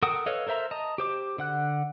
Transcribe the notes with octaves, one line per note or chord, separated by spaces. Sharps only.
A4 A#4 F#5 G5 D#6
A4 B4 C#5 D#5 F5
A4 A#4 C5 E5 A#5
D#5 A5 A#5
G4 C5 D6
D3 F#5 F#6